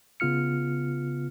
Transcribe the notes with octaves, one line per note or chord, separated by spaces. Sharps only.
C#3 B3 F4 F6 C#7